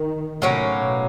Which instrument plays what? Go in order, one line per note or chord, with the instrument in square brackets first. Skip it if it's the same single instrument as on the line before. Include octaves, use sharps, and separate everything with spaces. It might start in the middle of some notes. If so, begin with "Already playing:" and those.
Already playing: [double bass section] D#3
[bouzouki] A2 F#3 A#3 C#4 [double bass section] C3
[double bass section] B2